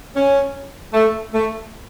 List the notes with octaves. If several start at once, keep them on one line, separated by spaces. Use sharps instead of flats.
C#4
A3
A3